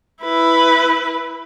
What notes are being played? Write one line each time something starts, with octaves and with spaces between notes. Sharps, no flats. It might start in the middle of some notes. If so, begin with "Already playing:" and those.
E4 B4